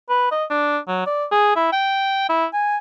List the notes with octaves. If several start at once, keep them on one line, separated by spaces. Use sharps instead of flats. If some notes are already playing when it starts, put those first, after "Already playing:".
B4
D#5
D4
F#3
D5
G#4
E4
G5
E4
G#5